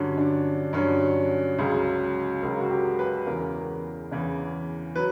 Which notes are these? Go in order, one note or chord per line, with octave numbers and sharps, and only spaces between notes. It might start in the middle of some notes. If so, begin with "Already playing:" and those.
Already playing: G2 D3 F#3 C#4
D4
G2 D3 F#3 C#4
C#2 C#3 F#3
C#2 C#3 F#3 A#4
F#4
G4
B4
E2 C#3 E3 A#4
E2 C#3 E3
F#3 B4